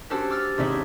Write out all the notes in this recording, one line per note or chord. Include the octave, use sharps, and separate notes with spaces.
C#4 D4 F#4 G4 A4 C5
D6 E6 F6 A6
G#1 C3 C#4 D#4 D5 E5